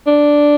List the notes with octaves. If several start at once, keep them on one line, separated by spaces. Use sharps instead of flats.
D4